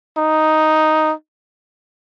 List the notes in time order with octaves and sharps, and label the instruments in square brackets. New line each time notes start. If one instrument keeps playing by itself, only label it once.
[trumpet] D#4